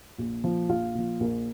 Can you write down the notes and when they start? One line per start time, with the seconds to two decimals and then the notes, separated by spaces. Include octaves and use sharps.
0.18 A#1
0.43 A#2 F3
0.69 A#1 F4 F5
0.95 A#2 F3
1.20 A#1 A#3 A#4